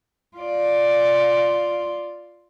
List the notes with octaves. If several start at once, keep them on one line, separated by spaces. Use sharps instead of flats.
F4 D5